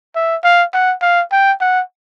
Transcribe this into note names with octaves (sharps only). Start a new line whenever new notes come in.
E5
F5
F#5
F5
G5
F#5